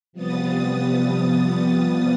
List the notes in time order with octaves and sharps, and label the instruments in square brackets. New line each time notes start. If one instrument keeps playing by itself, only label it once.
[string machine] C3 F3 G3 B3 D#6 A6